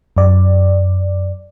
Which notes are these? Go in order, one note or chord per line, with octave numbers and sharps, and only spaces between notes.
F#2 D5